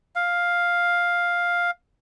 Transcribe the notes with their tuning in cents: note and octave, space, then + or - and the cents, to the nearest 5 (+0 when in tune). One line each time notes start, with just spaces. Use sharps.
F5 +5